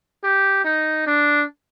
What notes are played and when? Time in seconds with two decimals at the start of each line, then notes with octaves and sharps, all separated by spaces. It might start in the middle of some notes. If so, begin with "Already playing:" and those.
0.24 G4
0.64 D#4
1.06 D4